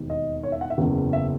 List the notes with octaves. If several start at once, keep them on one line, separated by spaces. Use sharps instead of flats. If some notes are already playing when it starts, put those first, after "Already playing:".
Already playing: E1 D#2 D#3
D#5
C#5
E5
F#5
E5
F#1 E2 C#3
E5